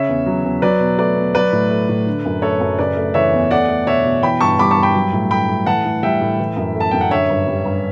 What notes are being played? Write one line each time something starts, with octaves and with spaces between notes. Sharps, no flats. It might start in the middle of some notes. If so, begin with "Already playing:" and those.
Already playing: C#3 C#5 E5
E2
F#3
E2
F#3 B4 D5
B2
A3 B4 D5
B2
F#3 B4 D5
A2
A3
A2
D3
F#2
A3 A4 C#5
F#2
C#3 B4 D5
A3
E3 C#5 E5
E2
A3 D5 F#5
A3
B2 C#5 E5
B2
E3 G5 B5
G2 A5 C#6
G3 B5 D6
A5 C#6
G2
G5 B5
F#3
A2
A3 G5 B5
A2
E3 F#5 A5
A2
G3 E5 G5
A2
E3
F#2
A3
A5
F#2 G5
F#5
D3 C#5 E5
G2
G3
G2